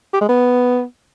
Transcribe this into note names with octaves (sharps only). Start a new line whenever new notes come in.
G4
G#3
B3